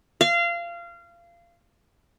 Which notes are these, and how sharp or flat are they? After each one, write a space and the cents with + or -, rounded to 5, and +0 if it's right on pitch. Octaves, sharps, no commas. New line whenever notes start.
F5 -25